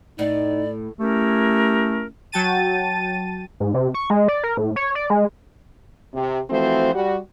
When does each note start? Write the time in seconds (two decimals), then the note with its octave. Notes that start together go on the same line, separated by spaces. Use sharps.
0.19 A2 D#4 D5
0.99 A3 C#4 E4 G4 A#4
2.32 F#3 F#4 G5 A5 A6 D#7
3.60 G#2
3.74 C3
3.94 C#6
4.10 G#3
4.28 D5
4.44 A#4
4.57 A2
4.76 C#5
4.95 D5
5.10 G#3
6.14 C3
6.50 E3 F3 A3 C4 F#4 C5
6.94 G3 F#4